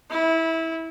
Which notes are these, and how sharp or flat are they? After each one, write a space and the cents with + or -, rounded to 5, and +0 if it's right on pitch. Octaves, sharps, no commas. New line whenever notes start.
E4 -20